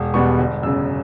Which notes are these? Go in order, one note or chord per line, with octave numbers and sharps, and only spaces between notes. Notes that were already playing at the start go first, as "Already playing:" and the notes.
Already playing: E1
E2 B2 G3 B3 C#6
G1
F#2 C#3 E6